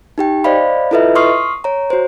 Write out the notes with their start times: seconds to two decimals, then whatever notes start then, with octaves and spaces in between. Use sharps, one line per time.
0.18 D#4 G4 G5
0.44 C5 D5 D#5 F5 B5
0.91 E4 F4 A4 B4 D#5 E5
1.15 C6 C#6 D#6 F6 C7
1.64 C#5 A#5
1.90 F#4 C5